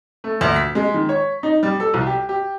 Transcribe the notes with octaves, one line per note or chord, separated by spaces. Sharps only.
A3
D2
B6
G#3
D#3
C#5
D#4
G3
A4
C2
G4
G4